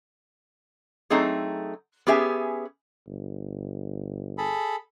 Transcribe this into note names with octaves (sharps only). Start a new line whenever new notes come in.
F#3 A3 C4 D#4 G#4
B3 C#4 G4 G#4 E5 G#5
G1
G#4 A4 B5